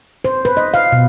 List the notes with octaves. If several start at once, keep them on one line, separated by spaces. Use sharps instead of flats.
C5
B4
D#5
F5
B2